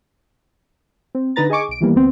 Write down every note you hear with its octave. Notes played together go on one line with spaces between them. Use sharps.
C4
D3 D#4 B4 A#5 A6
G#4 D#5 G#5 C#6 D6
B1 D7
D#3 E3 G3 A#3 B3
D2 B3 C4